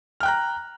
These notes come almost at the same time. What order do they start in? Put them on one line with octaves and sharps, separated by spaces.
F6 G5 F#6 A#5